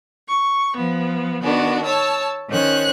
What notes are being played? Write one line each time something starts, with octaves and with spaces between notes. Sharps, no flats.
C#6
F3 B3
D#3 B3 D4 F#4
C#5 A5 E6
D#3 C#4 C5 C#5 F#6